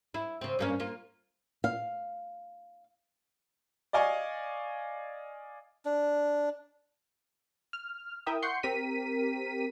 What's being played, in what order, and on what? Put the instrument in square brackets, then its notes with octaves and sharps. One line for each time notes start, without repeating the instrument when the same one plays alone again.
[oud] E4
C#3 C4
G2 A#3 C#4
A#3 F4
[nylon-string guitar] F5
[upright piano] D5 D#5 F5 G#5 C#6
[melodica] D4
[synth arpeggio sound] F6
E4 A#4 E5 G5 D#6
F#5 C6 C#6 G6 C7 C#7
C4 G4 A#4 B6 D#7